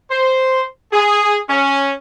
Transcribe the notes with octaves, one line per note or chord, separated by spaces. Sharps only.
C5
G#4
C#4